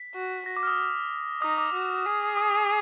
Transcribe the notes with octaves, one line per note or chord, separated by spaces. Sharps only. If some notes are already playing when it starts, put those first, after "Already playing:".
Already playing: B6
F#4
F#4 A#6
D6
F6
D#6
D#4 D#6
D6
F#4
G#4
D#6